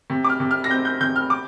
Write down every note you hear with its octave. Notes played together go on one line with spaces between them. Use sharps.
C3
D6
F6
C3
F6
A#6
C4 G6
G6
C3 G6
F6
D6